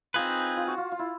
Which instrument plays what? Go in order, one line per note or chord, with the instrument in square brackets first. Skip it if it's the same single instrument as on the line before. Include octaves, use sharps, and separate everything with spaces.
[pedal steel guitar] C4 D#4 G#4 B4 [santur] F4
[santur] F4
F#4
F4
F4
E4